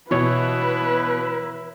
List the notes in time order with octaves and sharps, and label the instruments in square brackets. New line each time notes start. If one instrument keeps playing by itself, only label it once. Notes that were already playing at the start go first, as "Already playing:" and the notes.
[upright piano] B2 [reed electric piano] E3 C#5 [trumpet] E4 [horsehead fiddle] B4